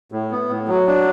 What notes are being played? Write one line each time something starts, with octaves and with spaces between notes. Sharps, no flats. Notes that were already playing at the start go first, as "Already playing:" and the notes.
A2
B3
A2
F#3
D4